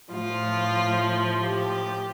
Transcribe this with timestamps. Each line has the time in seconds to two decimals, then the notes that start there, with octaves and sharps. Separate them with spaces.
0.12 A2 F3 F4
1.44 G4